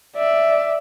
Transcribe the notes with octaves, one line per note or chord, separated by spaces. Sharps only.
D5 E5